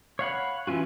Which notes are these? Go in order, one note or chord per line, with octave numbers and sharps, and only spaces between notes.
C#5 F5 F#5 B5
E3 C#4 F4 F#4